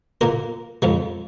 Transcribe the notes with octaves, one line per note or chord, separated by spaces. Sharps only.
A#2 A#3 A#4
F2 F3 G#3